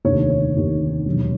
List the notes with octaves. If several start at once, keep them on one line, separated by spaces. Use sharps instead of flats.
F1 D#2 D3 C#5
C#5
F1 D#2 D3
E1 D#2 D3 F#3